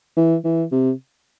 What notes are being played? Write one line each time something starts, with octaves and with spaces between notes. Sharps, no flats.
E3
E3
C3